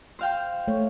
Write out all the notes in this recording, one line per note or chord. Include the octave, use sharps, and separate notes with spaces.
C5 F5 G5
A3 C#5